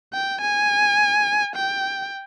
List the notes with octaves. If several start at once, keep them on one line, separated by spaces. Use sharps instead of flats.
G5
G#5
G5